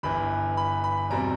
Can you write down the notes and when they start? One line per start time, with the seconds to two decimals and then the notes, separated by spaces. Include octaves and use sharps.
0.03 G1 G2 E3 B5
0.57 B5
0.84 B5
1.10 E2 B2 G3 C4 A#5